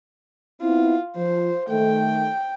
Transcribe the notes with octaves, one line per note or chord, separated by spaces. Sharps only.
B3 C4 E4 F4
F3 C5
D#3 A3 G5